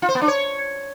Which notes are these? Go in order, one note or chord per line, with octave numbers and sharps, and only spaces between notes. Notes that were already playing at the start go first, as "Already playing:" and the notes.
F4
C5
B3
D4
C#5